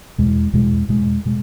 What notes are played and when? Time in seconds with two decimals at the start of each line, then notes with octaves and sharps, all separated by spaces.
0.18 E2 B2 G#3
0.53 E2 B2 G#3
0.89 E2 B2 G#3
1.25 B2 G#3